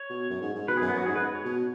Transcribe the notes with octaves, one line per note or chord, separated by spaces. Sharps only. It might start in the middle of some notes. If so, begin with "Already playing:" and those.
Already playing: C#5
B2
F#2
G#2
G#2
B2 B4
G#4
F#2
B3
F#2 F#4
G#2 G#4
B4
C#5
B2